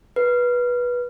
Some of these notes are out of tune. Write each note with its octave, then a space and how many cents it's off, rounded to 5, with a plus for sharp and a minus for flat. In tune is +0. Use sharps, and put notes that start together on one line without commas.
B4 -15